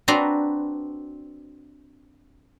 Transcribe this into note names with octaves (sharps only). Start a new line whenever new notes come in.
C4 D4 F#4 B4 A#5 C6